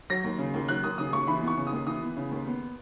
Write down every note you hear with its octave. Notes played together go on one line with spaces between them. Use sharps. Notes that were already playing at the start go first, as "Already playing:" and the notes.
F#3 A#6
D#2
C#3
D#2
F#3 F#6
D#2 D#6
C#3 D#6
D#2 C#6
E3 B5
B3 C#6
C#3
D#6
D#2
E3 D#6
B3
C#3
D#2
B3